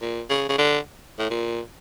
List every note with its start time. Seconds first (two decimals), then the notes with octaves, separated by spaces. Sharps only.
0.01 A#2
0.30 C#3
0.49 C#3
0.58 D3
1.19 A2
1.30 A#2